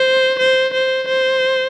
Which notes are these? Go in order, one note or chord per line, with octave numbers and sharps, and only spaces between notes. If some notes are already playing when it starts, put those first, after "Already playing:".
Already playing: C5
C5
C5
C5